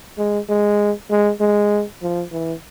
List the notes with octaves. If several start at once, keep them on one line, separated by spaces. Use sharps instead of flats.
G#3
G#3
G#3
G#3
F3
E3